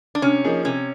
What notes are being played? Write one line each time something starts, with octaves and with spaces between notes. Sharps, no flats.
D4
C3 C#4
F3 A#3 D#4 G#4
C3 C#4